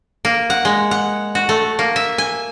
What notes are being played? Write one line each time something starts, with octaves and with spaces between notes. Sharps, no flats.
A#3
F#5
G#3
F#5
F#4
A3
A#3
E5
G#5